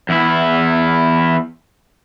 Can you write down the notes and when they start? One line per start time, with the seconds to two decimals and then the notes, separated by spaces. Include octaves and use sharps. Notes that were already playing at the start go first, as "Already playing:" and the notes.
0.09 E2 E4